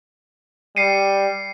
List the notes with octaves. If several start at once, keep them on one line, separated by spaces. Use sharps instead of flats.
G3 C7 C#7 D#7